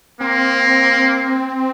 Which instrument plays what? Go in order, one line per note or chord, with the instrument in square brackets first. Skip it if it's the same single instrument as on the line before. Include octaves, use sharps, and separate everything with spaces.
[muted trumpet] A#3 [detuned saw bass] C4